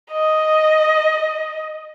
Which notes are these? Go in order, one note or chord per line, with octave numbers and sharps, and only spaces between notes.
D#5